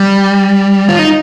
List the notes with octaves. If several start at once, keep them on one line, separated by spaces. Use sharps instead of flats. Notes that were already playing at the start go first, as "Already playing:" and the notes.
Already playing: G3
F4
D#4